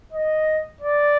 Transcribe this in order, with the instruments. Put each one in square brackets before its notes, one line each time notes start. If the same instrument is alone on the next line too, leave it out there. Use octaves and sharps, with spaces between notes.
[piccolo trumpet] D#5
D5